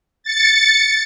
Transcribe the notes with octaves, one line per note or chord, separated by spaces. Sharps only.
A6 C#7